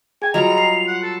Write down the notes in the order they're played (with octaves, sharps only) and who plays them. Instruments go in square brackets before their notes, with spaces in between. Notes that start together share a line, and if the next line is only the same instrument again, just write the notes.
[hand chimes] G#4 G5 [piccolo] G#5
[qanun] F#3 G3 F4 [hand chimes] D#5 [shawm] A#5 [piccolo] F7
[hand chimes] C7
[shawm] F#5
A4